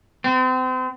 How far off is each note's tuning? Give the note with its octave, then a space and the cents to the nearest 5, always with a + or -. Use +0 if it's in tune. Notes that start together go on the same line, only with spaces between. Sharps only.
C4 -35